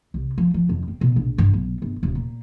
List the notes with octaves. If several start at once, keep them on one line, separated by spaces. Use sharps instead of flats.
C2
F3
F3
F2
C4
B2
A#1
G2
B1
G1
D#1
A#2